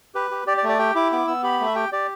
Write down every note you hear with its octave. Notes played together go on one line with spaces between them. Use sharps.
G4 B4
G4
G4 D5
D5
A3
D5
G4 G5
E4 D6
B3 D6
B3 E6
G4 B5
A3
E5
G4 G5
G4 D5